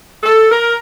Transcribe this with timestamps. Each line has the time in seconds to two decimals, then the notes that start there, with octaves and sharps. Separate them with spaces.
0.23 A4
0.51 A#4